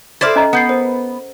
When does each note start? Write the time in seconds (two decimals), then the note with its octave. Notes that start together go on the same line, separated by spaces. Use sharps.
0.21 E4 A4 C5 D5 F6 A6
0.36 C#4 D#5 A#5
0.53 B3 F#5 G6 C7
0.69 A#4 C5